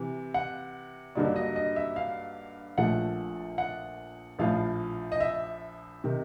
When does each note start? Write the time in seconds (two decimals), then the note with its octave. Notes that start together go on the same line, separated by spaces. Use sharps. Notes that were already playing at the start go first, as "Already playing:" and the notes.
Already playing: C3 E3
0.34 F#5
1.15 G2 D3 F#3 A#3 D#4 D5
1.36 D#5
1.56 D#5
1.76 E5
1.96 F5
2.78 A#1 A#2 F3 A3 F#5
3.58 F#5
4.39 A#1 A2 F3 F5
5.12 D#5
5.20 E5
6.04 C3 D#3